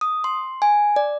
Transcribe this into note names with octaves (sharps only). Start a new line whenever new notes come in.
D#6
C6
G#5
D5